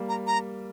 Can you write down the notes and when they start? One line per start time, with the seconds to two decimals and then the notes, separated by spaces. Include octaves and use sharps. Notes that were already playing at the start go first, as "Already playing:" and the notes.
Already playing: G3 A#3
0.09 A#5
0.27 A#5